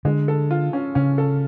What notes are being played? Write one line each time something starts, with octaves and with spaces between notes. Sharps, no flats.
D3 G#3
A4
F4
C#4
C#3 C#4
A4